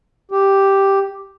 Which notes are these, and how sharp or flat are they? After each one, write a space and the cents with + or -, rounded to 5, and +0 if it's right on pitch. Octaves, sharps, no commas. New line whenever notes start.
G4 +0